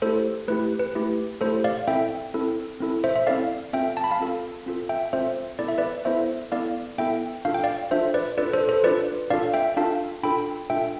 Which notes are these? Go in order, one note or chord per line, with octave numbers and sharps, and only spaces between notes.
A3 E4 G4 A4 C5
A3 E4 G4 B4
B4
A3 E4 G4
A3 E4 G4 A4 C5
D5 F5
C4 E4 A4 E5 G5
C4 E4 A4
C4 E4 A4
C5 E5
E5
C4 E4 A4 D5 F5
C4 F4 A4 E5 G5
A5
B5
F5 A5
C4 F4 A4
C4 F4 A4
E5 G5
C4 F4 A4 C5 E5
B3 E4 A4 D5
E5
B4 D5
B3 E4 A4 C5 E5
B3 E4 A4 D5 F5
B3 E4 A4 E5 G5
D4 F4 A4 F5
G5
D5 F5
D4 F4 A4 C5 E5
B4 D5
D4 F4 A4 B4 D5
A4 C5
A4 C5
D4 F4 A4 B4 D5
D4 F4 A4 D5 F5
E5 G5
D4 F4 A4 F5 A5
D4 F4 A4 G5 B5
D4 F4 A4 E5 G5